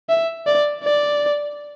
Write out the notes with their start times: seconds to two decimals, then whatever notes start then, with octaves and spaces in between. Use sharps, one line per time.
0.09 E5
0.46 D5
0.83 D5